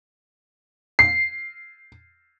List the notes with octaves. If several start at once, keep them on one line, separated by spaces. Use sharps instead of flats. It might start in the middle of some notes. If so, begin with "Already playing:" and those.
C7